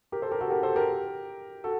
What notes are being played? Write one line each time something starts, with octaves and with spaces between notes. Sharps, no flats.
G4 A#4
A4 C5
G4 A#4
F#4 A4
G4 A#4
A4 C5
G4 A#4
F#4 A4